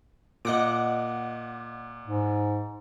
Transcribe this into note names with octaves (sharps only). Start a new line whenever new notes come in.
A#2 D#5 F#5 D6
G#2